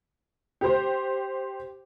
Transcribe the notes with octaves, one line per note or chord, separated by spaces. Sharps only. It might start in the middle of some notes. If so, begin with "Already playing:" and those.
G4 C5